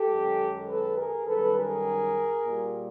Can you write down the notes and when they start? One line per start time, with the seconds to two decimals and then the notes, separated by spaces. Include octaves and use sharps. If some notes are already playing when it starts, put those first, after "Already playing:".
Already playing: G4 A4
0.09 F#2 D#3 G#3
0.68 A4 B4
0.97 G#4 A#4
1.27 F#2 D#3 G3 A4 B4
1.57 G#4 A#4
2.45 A#2 G3